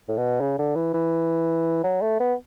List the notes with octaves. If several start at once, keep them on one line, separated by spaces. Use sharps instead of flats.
A2
B2
C#3
D3
E3
E3
F#3
A3
B3